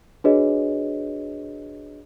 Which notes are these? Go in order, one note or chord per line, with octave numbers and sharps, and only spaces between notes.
D4 F#4 G#4 B4 C#5 D#5